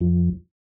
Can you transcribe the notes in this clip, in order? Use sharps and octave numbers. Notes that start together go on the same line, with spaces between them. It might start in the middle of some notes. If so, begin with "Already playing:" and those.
F2 F3